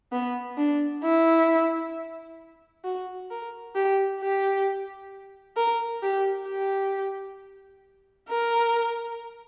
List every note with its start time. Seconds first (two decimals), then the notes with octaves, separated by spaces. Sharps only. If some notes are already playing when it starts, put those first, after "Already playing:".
0.12 B3
0.58 D4
1.04 E4
2.85 F#4
3.30 A#4
3.75 G4
4.21 G4
5.56 A#4
6.03 G4
6.47 G4
8.29 A#4